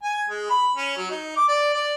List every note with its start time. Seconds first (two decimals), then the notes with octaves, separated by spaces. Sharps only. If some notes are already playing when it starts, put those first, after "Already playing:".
0.03 G#5
0.29 G#3
0.50 B5
0.76 C#4
0.97 F#3
1.11 D#4
1.37 D6
1.48 D5
1.74 D5